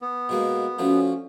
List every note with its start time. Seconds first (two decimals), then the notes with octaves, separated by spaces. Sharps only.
0.02 B3
0.29 B2 G#3 A#3
0.79 D3 F3 A3 C#4 F#4